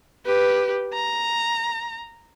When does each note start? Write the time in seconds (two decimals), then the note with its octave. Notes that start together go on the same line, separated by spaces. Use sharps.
0.26 G4 B4
0.94 A#5